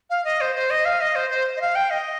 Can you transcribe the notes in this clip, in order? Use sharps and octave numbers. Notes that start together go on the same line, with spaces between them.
F5
D#5
C5
C5
D#5
F5
D#5
C5
C5
D#5
F5
G5
D#5